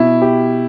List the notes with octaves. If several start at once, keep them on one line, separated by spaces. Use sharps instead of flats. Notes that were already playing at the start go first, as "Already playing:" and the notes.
Already playing: B2 E4
G4